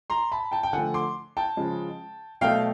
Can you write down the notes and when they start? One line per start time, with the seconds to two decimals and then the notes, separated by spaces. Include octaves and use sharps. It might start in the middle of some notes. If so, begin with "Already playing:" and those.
0.10 A#5 C6
0.32 A5 B5
0.51 G5 A5
0.63 G5
0.73 D3 F3 A3 F#5 G#5
0.94 C6 D6
1.37 G5 A5
1.57 C#3 F3 G#3
2.41 B2 F#3 A3 F5 G5